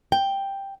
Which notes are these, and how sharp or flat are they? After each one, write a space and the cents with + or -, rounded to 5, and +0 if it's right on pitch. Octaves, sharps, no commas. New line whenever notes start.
G5 +5